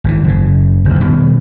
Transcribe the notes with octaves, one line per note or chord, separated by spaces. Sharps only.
G#1 C#3 E3
F#1 C#3
F#1 D2
B2 D#3 G3